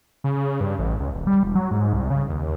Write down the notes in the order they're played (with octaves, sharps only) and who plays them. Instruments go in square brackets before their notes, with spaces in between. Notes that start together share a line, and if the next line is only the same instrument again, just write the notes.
[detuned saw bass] C#3
G2
A1
C#2
D#1
G3
E1
F#3
G#2
C2
C#3
D#2